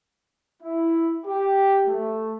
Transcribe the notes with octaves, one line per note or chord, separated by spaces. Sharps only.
E4
G4
A3